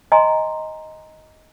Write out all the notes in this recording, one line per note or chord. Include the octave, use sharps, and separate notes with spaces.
D#5 G#5 A#5 C6